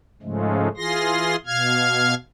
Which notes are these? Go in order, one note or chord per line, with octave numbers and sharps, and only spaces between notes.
G#2 C#3 F3 G#3 A3
E3 F4 G#4 C6 A#6
B2 F5 F6 G#6